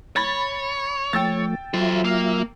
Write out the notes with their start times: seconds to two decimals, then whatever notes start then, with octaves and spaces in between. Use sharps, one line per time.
0.16 C#5 B5 A6
1.13 F3 A3 G5 E6 A6
1.74 F#3 F4 A4 C5 E5
2.05 A#3